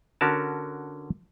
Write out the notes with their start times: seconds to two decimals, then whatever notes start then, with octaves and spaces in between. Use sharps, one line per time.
0.21 D3 C#4 F#4 A#4 A5